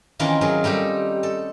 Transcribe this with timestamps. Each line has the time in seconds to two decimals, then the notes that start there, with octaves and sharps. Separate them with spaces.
0.20 D#3 E3 A#3 C4 C#4 F4
0.41 D#3 F#3 F4 G#4
0.64 G3 A3 D#4 G4
1.23 A4